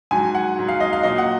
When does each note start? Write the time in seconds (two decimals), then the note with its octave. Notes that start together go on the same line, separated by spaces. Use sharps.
0.11 G#2 F#3 G#5
0.35 F#5
0.57 G#2 F#3
0.68 F5
0.80 D#5
0.93 F5
1.03 A#2 F#3 D#5
1.18 F#5